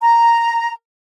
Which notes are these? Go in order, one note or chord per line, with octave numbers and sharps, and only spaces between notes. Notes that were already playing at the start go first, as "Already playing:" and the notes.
A#5